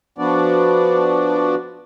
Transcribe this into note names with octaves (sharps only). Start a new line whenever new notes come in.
F3 B3 D4 F#4 D5